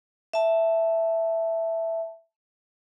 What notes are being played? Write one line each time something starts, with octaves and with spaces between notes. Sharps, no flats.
E5 A5